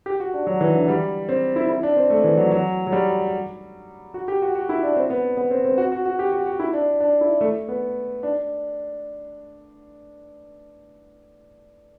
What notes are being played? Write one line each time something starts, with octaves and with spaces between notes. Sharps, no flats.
G4
F#4
D4
F#3
E3
D3
G3
C4
E4
E4
D4
C4
A3
E3
F#3
F#3
F#3
G3
F#4
G4
F#4
F#4
E4
D4
C4
B3
B3
C4
C4
F#4
F#4
F#4
G4
F#4
F#4
E4
D4
D4
E4
A3
B3
D4